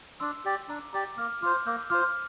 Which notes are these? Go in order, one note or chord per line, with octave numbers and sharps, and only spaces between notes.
D4 C6 E6
G4 D5
D4 A#5 D6
G4 D5 A#5 D6
A#3 D6 F6
F4 C5 D6 F6
A#3 E6 G6
F4 C5 D6 F6